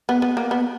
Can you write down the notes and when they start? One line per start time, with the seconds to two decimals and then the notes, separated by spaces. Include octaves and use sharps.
0.09 B3
0.22 B3
0.37 A#3
0.51 B3